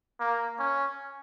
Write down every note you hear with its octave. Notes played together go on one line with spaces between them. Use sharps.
A#3
C#4